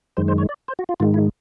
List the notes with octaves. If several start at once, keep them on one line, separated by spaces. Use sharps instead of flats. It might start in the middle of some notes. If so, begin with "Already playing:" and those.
F#2 D#3 G#3 C5
C5
C#5
D5
C5
F#4
F4
G#2 D#3 G#3 F4
E4